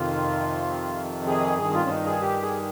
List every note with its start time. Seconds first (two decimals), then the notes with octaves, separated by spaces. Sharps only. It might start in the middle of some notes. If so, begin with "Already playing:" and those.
Already playing: F2 C3 D#3 F4
1.27 G#4
1.58 G2 D#3 G#4
1.74 F4
1.84 C#4
1.90 D#4
2.06 G#4
2.21 G4
2.42 G#4